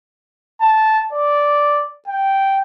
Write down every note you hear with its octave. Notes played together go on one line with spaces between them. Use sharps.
A5
D5
G5